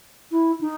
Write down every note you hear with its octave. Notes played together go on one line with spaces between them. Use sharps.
E4
D#4